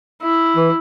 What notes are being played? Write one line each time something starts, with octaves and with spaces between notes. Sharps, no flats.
E4
E3